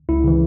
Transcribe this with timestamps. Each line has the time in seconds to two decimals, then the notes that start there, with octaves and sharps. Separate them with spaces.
0.09 C#2 E4
0.24 C#3 E3